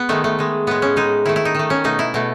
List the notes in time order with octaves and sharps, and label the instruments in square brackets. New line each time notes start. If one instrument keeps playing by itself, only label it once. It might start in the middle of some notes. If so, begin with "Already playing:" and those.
Already playing: [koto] B3
D#3 G#3 A3
A3
D#3 G#3
A2 G#3 B3
C#4
A2 G#3 D#4
D#3 A3 E4
E4
D#4
D#3 A3
C#4
B2 A3 D#4
E4
B2 A3